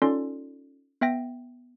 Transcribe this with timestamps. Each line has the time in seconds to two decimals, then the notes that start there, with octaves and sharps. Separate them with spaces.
0.02 C#4 D#4 F4 A4 D5 C6
1.01 B3 E5 G5 A#6